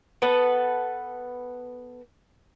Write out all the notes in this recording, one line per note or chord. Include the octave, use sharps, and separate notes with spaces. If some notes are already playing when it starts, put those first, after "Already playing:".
B3 A4 B4